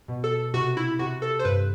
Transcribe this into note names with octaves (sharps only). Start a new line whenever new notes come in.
B2
A4
C3 F#4
E4
C3 F#4
A4
C5
G2 B4